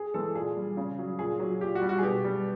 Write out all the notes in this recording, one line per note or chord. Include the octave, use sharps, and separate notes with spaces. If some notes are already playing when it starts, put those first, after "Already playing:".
Already playing: G#4
E3 G#3 A4
A#2 G#4
G3
C#3
F#3
A#2 G#4
F#3
A#2 G4
F#4
G3
F#4
G#4
B2 G4
G3